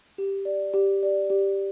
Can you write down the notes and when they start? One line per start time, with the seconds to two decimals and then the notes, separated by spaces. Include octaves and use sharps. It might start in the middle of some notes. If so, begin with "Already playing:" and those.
0.18 G4
0.45 D5
0.74 G4
1.03 D5
1.30 G4